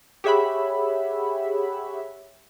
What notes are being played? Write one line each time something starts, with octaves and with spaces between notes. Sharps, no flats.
G4 G#4 C#5 E5 F#5 B5